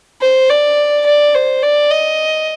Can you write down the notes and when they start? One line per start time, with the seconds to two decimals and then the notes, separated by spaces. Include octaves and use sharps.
0.21 C5
0.50 D5
1.06 D5
1.35 C5
1.62 D5
1.91 D#5